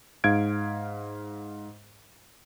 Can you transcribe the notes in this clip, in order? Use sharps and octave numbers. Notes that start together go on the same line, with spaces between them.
G#2 F5 G#6 D7